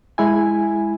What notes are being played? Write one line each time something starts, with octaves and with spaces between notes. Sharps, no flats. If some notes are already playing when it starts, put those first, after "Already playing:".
G#3 E4 G#5